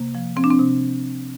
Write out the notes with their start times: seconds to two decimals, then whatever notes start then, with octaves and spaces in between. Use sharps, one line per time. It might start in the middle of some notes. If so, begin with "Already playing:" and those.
Already playing: C3 A#3
0.15 F3
0.37 F3 C4
0.44 D4
0.50 C4
0.59 C3